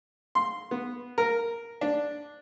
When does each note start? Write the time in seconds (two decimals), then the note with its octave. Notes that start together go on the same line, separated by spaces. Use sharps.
0.35 C6
0.71 B3
1.18 A#4
1.81 D4